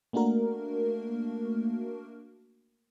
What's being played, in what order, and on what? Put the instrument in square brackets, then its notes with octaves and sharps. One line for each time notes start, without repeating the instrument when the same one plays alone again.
[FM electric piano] A3 A#3 D4 F#4 A#4